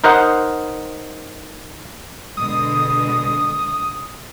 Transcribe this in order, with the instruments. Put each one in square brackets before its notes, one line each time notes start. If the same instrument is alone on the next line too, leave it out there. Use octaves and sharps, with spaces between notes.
[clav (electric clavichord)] D#4 A#4 C5 D#5 F#5
[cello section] B2 D3 G#3 [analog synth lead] D#6